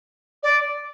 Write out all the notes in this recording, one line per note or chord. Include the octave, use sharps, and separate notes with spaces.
D5